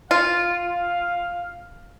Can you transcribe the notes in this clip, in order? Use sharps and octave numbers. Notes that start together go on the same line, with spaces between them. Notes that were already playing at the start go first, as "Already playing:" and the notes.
F4 F5